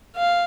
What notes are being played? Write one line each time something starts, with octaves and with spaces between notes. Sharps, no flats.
F5